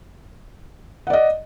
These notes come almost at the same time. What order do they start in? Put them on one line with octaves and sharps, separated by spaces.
F#5 D5 D#5